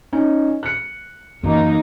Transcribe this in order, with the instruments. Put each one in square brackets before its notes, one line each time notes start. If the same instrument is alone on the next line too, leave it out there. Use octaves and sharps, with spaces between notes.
[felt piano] C#4 D#4
F#6 C#7
[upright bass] F#2 E3 [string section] A#3 D#4